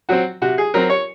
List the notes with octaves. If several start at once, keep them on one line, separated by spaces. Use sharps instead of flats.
F#3 C4 F#4
C3 F#4
G#4
F#3 C4 A#4
C#5